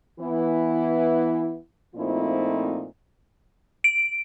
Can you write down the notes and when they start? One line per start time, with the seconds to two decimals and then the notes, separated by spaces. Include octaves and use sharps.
0.20 E3 B3 E4
1.95 A#2 F3 A3 C4 D#4 E4
3.84 D7